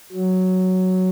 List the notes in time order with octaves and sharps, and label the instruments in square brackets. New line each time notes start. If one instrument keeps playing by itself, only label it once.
[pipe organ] F#3